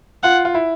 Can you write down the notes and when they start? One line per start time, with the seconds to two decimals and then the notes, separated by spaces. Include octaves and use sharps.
0.23 F4 F#5
0.45 F4
0.54 E4